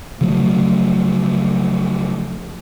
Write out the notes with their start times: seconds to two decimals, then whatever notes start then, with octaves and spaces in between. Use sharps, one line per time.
0.21 C#3 F3 F#3 A3